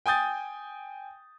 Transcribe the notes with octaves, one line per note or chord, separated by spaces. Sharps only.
G5 G#5 D#6 G6 A6